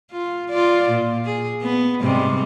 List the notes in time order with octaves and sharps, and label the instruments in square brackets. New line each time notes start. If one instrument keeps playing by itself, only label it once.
[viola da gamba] F4
F4 D5
A#2
G#4
B3
G#2 C3 G3